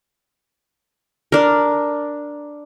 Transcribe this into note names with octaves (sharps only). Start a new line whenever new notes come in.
D4 A#4